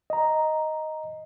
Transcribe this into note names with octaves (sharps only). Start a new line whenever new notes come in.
D#5 A#5